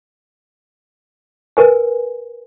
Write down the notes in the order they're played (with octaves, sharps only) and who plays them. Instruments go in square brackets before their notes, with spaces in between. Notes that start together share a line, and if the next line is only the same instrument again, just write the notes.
[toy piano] A#4 B4 G#5